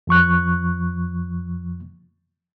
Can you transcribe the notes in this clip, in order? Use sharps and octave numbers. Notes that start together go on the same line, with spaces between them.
F2 F3 C#6 F#6